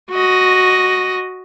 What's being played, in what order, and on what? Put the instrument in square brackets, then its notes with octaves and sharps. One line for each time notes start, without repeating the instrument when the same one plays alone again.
[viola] F#4 D#5